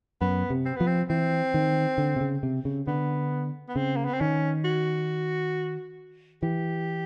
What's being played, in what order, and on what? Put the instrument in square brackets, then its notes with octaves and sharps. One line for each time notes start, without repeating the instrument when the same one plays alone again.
[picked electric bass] F#2 [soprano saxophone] B3
[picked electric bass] C3
[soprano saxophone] C4
[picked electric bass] F3 [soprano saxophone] B3
[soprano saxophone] C4
[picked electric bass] E3 [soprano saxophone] C4
[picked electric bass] D#3
D3
C3
C#3
C3
C#3
[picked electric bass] D3 [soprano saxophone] B3
[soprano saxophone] B3
[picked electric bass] C#3 [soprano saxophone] C4
[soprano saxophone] A#3
B3
C4
[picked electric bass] D#3 [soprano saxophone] C#4
[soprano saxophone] F#4
[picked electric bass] E3 [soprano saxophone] G4